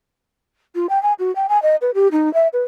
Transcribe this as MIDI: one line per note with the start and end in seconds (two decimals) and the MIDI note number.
0.75 0.87 65
0.89 1.01 79
1.03 1.13 80
1.19 1.34 66
1.35 1.47 79
1.49 1.61 80
1.62 1.76 75
1.81 1.91 71
1.94 2.08 67
2.12 2.32 63
2.34 2.48 76
2.53 2.63 71